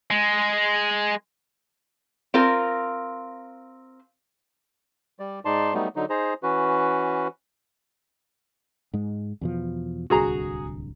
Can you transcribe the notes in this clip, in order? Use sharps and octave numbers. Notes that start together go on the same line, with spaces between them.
G#3
C4 F4 A#4
G3 D5
G#2 D#4 D5 A5 C6
F#3 G3 A3 B3 D#4
D3 F#3 D#4
D#4 G#4 C5 A#5
E3 C#4 F#4 B4
G#2 G#3
E2 B2 F3
D1 C2 D3 F#4 G#4 A#5